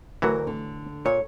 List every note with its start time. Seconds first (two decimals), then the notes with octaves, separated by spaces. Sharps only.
0.22 D2 E3 F#3 F#4 A#4
0.47 D3
1.06 A#2 C#5